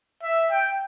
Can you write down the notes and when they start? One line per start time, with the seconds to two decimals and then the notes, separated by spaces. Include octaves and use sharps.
0.23 E5
0.51 G5